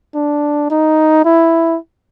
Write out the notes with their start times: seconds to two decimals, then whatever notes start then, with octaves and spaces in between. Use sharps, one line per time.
0.15 D4
0.70 D#4
1.25 E4